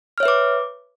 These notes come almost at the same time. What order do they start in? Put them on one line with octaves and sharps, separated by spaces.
F6 C#5 E5 B4 D6